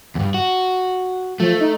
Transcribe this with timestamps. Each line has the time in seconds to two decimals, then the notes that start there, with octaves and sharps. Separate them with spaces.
0.15 E2 G2
0.34 F#4
1.40 F3 A3
1.60 D#4